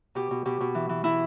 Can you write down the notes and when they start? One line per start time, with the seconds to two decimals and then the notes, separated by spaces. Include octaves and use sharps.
0.15 B2 G4
0.31 B2
0.45 B2 G4
0.60 B2
0.75 E3
0.89 E3
1.04 E3 E4